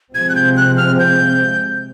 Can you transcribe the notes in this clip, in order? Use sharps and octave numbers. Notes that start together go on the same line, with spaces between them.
C3 F3 G#3 C4 G#6
F#6
G6
F#6
F6
G6